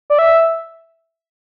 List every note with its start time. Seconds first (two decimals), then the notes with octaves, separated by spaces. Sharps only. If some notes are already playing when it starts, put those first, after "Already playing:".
0.10 D5
0.19 E5